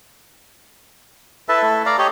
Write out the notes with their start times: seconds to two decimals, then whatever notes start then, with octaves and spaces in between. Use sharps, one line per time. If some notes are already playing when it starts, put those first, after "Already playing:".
1.49 E4 A4 B4 E5 A5
1.63 A3
1.86 D5 F5 A#5
1.98 G4 C#5 D#5